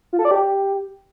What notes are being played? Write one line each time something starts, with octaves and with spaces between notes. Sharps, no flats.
F4
A4
D5
G4